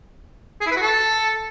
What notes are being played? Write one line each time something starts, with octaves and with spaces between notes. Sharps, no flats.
G#4
E4
B4
F#4
A4